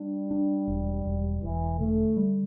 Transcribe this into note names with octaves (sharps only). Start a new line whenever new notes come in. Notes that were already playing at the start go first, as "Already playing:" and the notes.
Already playing: G3 D4
D4
E1
E1
E1 E3
D3 A3
G3